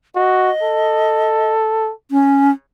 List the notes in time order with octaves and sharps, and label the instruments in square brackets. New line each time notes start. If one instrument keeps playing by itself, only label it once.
[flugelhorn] F#4 [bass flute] D#5
[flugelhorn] A4
[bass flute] C#4